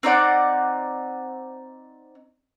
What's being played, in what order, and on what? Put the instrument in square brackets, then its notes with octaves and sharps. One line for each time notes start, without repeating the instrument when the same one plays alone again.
[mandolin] C4 D#4 D5 F#5